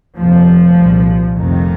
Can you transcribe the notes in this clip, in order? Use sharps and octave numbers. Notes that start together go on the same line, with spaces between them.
F1 D#2 F3
C2 A#2
F1 F2 C3 D#3